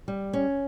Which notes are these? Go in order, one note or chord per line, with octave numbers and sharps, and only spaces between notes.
G3
C#4